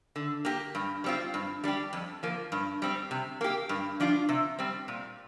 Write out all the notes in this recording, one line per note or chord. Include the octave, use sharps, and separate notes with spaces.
D3
A#3 G4
G2
G3 C4 F4
G2
G3 D4 G4
F2
F3 A#3
G2
G3 C4
C3
A#3 G4
G2
F3 D4 F4
C3
G3 C4
A#2